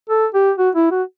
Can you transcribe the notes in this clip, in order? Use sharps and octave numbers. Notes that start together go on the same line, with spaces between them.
A4
G4
F#4
E4
F#4